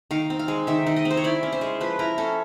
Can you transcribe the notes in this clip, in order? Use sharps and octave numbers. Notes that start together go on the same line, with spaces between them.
D#3 F5
C4
F5
G#3
D#3 E5
D#3
D#5
C4
C5
C#5
E4 D5
C#4
C5
G#3
F3 B4
E4 A#4
C#4 A4